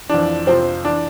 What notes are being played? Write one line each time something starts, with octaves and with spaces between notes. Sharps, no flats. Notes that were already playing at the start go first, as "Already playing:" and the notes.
F2 E3 D4
F2 C3 F3 C4
E3 D4